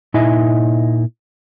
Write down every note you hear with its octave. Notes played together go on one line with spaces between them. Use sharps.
A#2 D#4 E4 D#5 E5 G#5